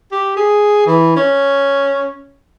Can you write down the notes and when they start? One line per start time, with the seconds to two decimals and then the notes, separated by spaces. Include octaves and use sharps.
0.12 G4
0.37 G#4
0.87 E3
1.17 C#4